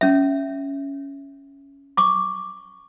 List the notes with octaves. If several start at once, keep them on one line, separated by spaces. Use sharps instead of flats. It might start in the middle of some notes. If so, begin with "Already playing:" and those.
C#4 E5
C#6 D6